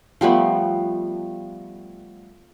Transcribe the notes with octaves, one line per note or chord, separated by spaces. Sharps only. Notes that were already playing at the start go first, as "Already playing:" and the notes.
F3 G3 A3 B3